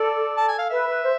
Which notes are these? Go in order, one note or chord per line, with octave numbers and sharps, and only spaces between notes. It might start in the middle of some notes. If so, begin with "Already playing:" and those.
Already playing: A4 D5
A5
G#5
F5
B4 E5
B4
C5